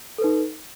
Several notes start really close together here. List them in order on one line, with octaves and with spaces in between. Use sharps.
A4 B4 D#4